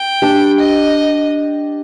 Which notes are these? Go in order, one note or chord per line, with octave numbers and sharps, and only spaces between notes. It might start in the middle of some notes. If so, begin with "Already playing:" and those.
Already playing: G5
D4 G4 D5
D#5